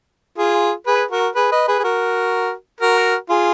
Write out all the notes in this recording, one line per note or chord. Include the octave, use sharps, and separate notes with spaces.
F4 G#4
G#4 B4
F#4 A#4
G#4 B4
B4 D#5
G#4 B4
G#4
F#4 A#4
F#4 A#4
F4 G#4